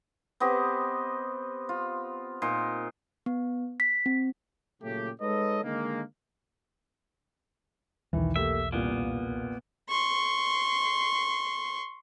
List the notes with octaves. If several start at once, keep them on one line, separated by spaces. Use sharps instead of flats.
B3 C4 G4 D#5
F4
A#2 D#4 C6
B3
B6
C4
A#2 C#3 F#3 A3 C#4 G4
G#3 D#4 A4 B4 C#5 D#5
D3 D#3 G#3 A#3
B1 E2 D#3 E3
A3 A#3 G4 E5
C2 A#2 A#3 B3
C6 C#6